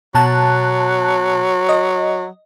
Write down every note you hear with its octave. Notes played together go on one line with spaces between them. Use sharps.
B2 F#3 A5 F#6
D#5